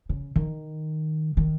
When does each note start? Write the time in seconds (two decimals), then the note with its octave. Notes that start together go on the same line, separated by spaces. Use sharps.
0.09 C#3
0.36 D#3
1.37 D#3